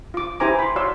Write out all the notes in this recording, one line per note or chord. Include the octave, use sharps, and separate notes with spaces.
F4 D6
E4 G4 C5 G#5 A#5 D6
B5 C6
F#4 C#5 D5 F5 C6 E6